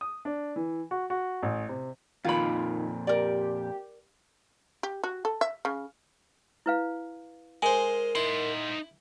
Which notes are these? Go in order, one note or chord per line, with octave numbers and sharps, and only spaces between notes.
D#6
D4
E3
F#4
F#4
A1
C3
F2 A#2 D#3 F4 B5
G4 A#4 D5
G4
F#4
A4
E5
C#3
E4 B4 F5
G#3 A#4 C5 G#5
D#4 E4 C6